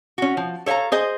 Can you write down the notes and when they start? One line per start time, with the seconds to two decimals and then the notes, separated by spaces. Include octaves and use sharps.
0.18 C#4 F#4
0.37 F3
0.66 A4 C#5 E5 F5 A#5
0.92 G#4 C5 D#5